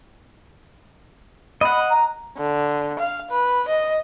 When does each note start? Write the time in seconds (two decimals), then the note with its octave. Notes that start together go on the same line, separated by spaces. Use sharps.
1.61 D#5 F#5 B5
1.90 A#5
2.37 D3
2.99 F5
3.31 B4
3.68 D#5